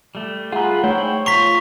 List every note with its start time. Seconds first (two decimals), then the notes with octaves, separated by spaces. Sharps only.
0.15 G3 A3
0.52 F4 G#4 B4 F#5 A#5
0.84 A3 E4 C5 C#5 G5
1.26 F4 A#5 C6 C#6 B6